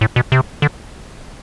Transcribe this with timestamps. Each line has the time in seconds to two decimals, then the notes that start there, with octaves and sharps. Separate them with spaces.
0.01 A2
0.16 B2
0.32 C3
0.62 D3